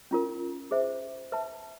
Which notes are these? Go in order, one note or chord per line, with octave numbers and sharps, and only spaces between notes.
C#4 F4 A#4
G#4 C5 E5
B4 E5 A5